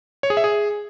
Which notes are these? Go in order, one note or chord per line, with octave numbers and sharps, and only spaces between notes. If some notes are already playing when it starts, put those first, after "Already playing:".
C#5
G#4
E5
G#4